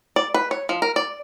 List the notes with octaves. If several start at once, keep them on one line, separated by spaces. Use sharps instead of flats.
D5
B4
C#5
F3
A#4
D5